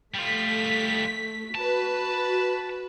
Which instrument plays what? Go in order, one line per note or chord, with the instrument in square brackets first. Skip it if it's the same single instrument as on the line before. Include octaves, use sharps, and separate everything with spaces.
[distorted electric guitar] G3 F4 [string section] A3 B6
[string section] F#4 B4 [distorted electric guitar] A5